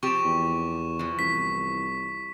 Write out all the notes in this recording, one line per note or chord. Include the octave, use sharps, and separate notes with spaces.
F3 C4 G4 C#6 E7
E2
E3 F3
C2 B6